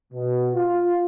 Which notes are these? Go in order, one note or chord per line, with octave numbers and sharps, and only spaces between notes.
B2
F4